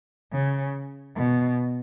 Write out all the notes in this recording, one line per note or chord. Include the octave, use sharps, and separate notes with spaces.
C#3
B2